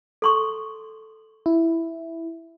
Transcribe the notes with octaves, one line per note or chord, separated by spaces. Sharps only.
A4 C6 C#6
E4